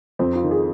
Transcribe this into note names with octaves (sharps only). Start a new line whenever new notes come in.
F2 C4
F4
D#3
G#4